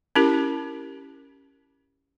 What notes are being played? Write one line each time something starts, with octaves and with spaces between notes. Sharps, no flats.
C#4 E4 G4 A#4